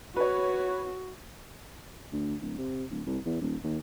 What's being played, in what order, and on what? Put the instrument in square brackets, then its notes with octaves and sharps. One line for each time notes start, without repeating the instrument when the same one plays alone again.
[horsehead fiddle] F#4 [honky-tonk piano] B4 C#5
[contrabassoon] D2
D1
C3
D1
C2
E2
D#1
D#2